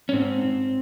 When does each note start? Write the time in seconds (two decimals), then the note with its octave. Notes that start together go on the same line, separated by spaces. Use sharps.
0.09 C#4
0.13 G#2 C4